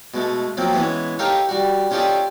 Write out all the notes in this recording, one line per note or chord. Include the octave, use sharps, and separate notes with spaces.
B2 G#3 A3
F3 F#3 A#3 C4
E3 G#3 B3 C#4
D#4 G4 A4 A#4 C#5 F5
G3 F#4
C#4 F4 G4 A4 D5 D#5